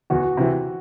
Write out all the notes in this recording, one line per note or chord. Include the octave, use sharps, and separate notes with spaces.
E2 F#4
C3 E3